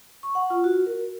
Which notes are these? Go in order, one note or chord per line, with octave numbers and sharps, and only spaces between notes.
C#6
F#5
F4
F#4
A#4